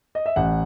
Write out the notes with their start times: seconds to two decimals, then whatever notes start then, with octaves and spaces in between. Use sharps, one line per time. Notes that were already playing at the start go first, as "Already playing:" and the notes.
0.15 D#5
0.26 E5
0.36 A1 F#5